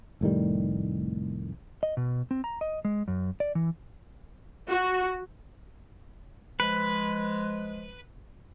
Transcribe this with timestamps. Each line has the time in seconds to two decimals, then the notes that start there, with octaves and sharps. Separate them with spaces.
0.21 F1 A2 D#3 G3
1.83 D#5
1.97 B2
2.31 C4
2.44 A#5
2.61 D#5
2.85 G#3
3.08 F#2
3.40 D5
3.55 E3
4.69 F#4
6.60 F3 G#3 B4